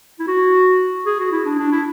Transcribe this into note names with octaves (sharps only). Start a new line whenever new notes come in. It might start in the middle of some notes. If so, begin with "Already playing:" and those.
E4
F#4
G#4
F#4
E4
D4
D4
E4